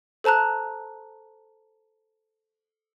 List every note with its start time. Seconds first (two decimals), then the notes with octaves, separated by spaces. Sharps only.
0.24 A4 C5 A5 A#5 F#6